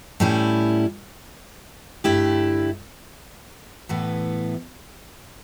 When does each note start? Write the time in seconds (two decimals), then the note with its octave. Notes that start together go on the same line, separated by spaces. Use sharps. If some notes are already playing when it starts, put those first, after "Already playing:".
0.20 A2 G3 C#4 E4
2.04 G2 D3 A3 E4 G4
3.89 A2 E3 B3